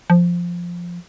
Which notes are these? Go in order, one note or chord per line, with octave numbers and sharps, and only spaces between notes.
F3